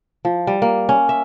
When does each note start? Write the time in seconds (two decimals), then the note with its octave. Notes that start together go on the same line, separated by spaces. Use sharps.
0.25 F3
0.47 G3
0.62 A#3
0.89 C#4
1.09 E5